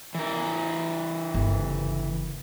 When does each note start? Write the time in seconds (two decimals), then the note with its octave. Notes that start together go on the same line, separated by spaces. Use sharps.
0.15 E3 A#4
1.34 G1 C#3